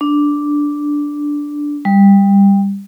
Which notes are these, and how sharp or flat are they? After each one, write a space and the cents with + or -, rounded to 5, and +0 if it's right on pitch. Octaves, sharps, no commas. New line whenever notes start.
D4 -5
G3 +20